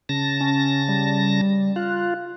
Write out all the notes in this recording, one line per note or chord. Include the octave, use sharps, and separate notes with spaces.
C#3 A5 A#6
C#4
G3
F4 F#6